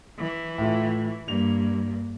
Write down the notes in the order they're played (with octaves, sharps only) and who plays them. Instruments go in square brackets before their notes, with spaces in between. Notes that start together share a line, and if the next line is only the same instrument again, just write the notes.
[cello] E3
[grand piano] A2 A3 F4
[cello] G2 A#3 [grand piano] F7